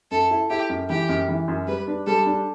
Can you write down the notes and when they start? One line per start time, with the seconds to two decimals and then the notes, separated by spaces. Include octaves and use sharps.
0.11 F#2 A4
0.31 E4
0.50 E4 G4
0.69 F#2
0.89 E3 G4
1.09 F#2
1.28 E3
1.48 F#2
1.67 G3 B4
1.87 D4
2.07 G3 A4
2.26 D4